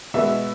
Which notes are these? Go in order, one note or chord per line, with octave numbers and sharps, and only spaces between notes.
B2 G#3 B3 E5